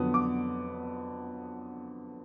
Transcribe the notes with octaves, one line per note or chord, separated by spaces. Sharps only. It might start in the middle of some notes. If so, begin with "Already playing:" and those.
Already playing: F2 D3 F#3 B3 D#6
D6